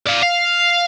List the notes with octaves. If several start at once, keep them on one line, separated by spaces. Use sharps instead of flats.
D5 F5
F5